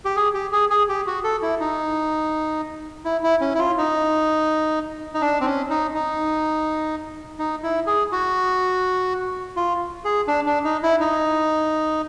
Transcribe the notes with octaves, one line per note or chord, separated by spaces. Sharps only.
G4
G#4
G4
G#4
G#4
G4
F#4
A4
E4
D#4
E4
E4
C#4
E4
F4
D#4
D#4
D4
C4
C#4
D#4
D#4
D#4
E4
G#4
F#4
F4
G#4
D4
D4
D#4
E4
D#4